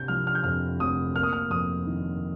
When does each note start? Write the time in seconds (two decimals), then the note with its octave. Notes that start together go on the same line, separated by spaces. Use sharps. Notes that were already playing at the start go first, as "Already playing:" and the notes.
Already playing: C3 G6
0.08 F3 F6
0.27 F6
0.35 G6
0.44 F2 F6
0.80 F1 D#6
1.15 A#3 F6
1.23 D#6
1.33 F6
1.50 F2 D#6
1.87 D#3